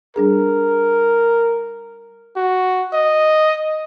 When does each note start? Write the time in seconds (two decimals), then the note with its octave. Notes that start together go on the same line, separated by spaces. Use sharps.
0.16 G3 D4 G#4 A#4
2.36 F#4
2.94 D#5